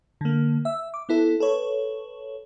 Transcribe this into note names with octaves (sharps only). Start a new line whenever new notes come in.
D3 A#3
E5 E6
D6
B3 E4 A4
A4 B4 C#5